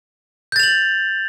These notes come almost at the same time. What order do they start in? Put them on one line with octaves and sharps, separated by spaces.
G6 A6 F7 F#7